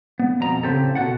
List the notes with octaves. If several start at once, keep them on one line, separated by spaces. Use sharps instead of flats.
B3
F2 B2 A#5
A2 C#3 C4 G4 A4
B2 F#4 A4 F#5